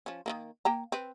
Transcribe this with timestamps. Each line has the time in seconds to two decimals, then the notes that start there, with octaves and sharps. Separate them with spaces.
0.06 F3 C#4
0.26 D#3 E3 A#3
0.65 A#3 G5 A#5
0.92 C4 B4